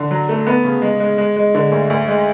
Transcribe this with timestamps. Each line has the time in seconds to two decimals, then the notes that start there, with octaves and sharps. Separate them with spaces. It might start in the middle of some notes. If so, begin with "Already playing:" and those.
Already playing: D3
0.11 F#3
0.29 A3
0.47 B3
0.65 C#3
0.82 G#3
1.00 G#3
1.18 G#3
1.36 G#3
1.55 D3
1.72 D2
1.90 D2
2.08 G#3